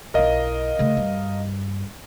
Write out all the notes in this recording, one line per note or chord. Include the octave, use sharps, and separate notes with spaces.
B1 E4 A#4 D#5 F5
C#3 A3
G2